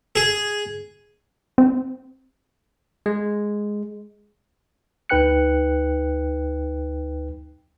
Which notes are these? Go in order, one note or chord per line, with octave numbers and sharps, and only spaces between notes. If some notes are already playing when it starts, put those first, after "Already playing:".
G#4
C4
G#3
D2 D#4 B4 G5 F#6 C#7